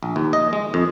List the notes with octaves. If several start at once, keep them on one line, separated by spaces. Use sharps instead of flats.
A#1
D#2
D#5
G#3
F2